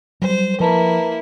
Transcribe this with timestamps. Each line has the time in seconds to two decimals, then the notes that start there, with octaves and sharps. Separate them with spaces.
0.22 F#3 G3 C5
0.60 F3 A#3 E4 B4 A5 A#5